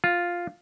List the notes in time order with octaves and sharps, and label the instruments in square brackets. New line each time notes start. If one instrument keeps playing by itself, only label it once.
[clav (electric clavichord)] F4